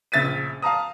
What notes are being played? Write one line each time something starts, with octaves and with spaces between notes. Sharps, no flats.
A#1 C#3 E5 A6 B6 D#7
F5 A5 A#5 D#6